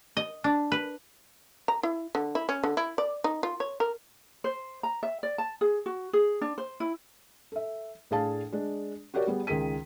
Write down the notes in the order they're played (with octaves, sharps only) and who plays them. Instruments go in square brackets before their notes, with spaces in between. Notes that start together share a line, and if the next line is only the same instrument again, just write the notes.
[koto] D#5
D4
B4
[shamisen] A#5
E4
D3
E4
C#4
D3
E4
D5
D#4
F4
C#5
A#4
[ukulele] C5
A#5
E5
D5
A5
G#4
F#4
G#4
D4
C5
E4
[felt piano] A4 E5
A2 D4 G#4 F5 A5
G#3 D4
F#4 G4 A#4 C#5 D5
G3 B3 G#4
C#2 D#3 G#4 A#4 B6 D#7